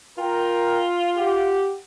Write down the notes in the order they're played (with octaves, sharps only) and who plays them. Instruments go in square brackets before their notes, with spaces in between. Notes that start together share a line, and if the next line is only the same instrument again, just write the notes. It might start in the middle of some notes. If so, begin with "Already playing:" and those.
[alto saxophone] F4 [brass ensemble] A#4 G5
[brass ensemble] G4 F#5